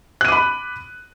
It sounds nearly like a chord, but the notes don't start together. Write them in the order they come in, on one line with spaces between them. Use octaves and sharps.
F#6 D#7 D6 B5